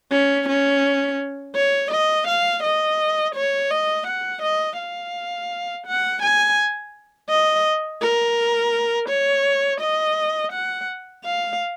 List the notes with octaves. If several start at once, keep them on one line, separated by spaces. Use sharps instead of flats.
C#4
C#4
C#5
D#5
F5
D#5
C#5
D#5
F#5
D#5
F5
F#5
G#5
D#5
A#4
C#5
D#5
F#5
F5